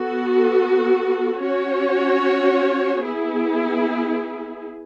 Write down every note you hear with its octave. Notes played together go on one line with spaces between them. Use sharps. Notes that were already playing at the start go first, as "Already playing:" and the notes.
Already playing: B3 F#4 A4
C#4 F#4 C#5
B3 E4 G#4